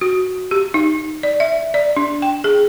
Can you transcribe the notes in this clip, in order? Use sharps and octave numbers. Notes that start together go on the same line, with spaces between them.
F#4
G4
D#4
D5
E5
D5
D4
G5
G#4